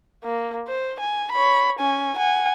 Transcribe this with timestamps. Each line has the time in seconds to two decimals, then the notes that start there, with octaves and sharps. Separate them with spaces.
0.24 A#3
0.68 C5
1.00 G#5
1.32 C#5 B5
1.80 C#4 G#5
2.17 F#5 G#5